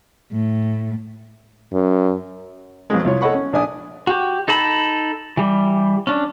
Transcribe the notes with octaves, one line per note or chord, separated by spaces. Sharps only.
A2
F#2
F2 B2 F#3 G#3
C2 F4 C#5
A4 C#5 D#5 F#5 B5 C#6
C#4
A#1 D4 G#5 D#6
F#4 G4
D#4 A4 A5 B5
E3 G3
C#4 D4